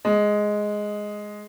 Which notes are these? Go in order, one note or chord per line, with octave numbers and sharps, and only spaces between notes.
G#3